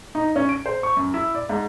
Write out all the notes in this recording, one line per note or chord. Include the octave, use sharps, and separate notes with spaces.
D#4
C#4
D7
C5
C#6
F#2
E4
D5
G#2